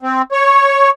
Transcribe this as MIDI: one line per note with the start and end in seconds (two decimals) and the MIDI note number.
0.02 0.22 60
0.32 0.90 73